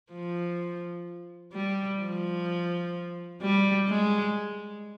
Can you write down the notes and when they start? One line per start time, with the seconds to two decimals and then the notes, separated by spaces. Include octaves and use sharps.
0.12 F3
1.53 G3
2.00 F3
3.41 G3
3.88 G#3